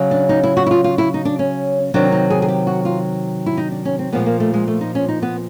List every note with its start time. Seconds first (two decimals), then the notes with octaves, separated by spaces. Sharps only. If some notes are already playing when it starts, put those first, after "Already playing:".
Already playing: C#3 F#3
0.11 D4
0.29 D#4
0.43 E4
0.57 F#4
0.66 E4
0.71 F4
0.84 F4
0.98 E4
1.14 D#4
1.25 D4
1.39 C#4
1.94 C3 D#3 F#3 D4
2.12 D#4
2.30 G#4
2.42 G#4
2.48 G4
2.67 F#4
2.85 F4
3.46 E4
3.57 D#4
3.72 D4
3.85 C#4
3.99 C4
4.12 A#2 F3 G#3 B3
4.26 A#3
4.40 A3
4.54 G#3
4.68 A3
4.81 D#4
4.95 C#4
5.08 D#4
5.22 B3